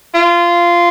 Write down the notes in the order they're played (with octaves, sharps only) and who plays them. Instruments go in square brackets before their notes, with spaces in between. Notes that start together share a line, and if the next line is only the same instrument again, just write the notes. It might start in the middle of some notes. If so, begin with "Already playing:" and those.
[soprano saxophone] F4